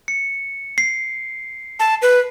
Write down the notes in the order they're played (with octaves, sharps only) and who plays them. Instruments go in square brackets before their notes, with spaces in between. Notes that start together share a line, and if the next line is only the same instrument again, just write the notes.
[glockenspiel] C#7
C7
[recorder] A5
B4